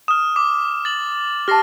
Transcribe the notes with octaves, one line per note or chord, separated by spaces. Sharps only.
D#6 F6 E7
D6
A6 F#7
G4 A5 F6 A#6 C7